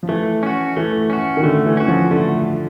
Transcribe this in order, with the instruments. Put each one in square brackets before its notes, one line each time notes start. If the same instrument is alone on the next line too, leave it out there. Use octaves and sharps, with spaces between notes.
[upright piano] F3
[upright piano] E3 [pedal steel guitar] A3
[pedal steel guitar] C#4 F#4
[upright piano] E3 [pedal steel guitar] A3
[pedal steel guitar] C#4 F#4
[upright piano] D#3
[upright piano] D3 [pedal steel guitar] A3
[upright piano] E3
[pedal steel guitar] C#4 F#4
[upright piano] F3
[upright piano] D3 [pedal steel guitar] A3